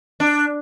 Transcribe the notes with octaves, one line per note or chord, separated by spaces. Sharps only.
D4